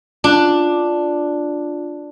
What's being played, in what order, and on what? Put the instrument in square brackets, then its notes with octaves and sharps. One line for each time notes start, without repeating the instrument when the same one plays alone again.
[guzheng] D4 [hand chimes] F4